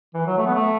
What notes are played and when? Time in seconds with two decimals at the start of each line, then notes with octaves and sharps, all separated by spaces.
0.14 E3
0.27 F#3
0.38 A3
0.47 B3
0.54 A3